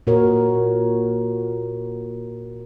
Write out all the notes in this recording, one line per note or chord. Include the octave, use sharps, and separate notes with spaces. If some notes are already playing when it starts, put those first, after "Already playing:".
A#2 F#4 A#4 C#5